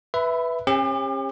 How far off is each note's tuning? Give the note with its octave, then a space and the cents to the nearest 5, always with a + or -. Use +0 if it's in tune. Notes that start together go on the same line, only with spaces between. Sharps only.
B4 +0 E5 +0 B5 +30
C#4 -35 G4 +35